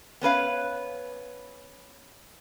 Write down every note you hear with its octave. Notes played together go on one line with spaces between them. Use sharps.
B3 C#4 B4 F5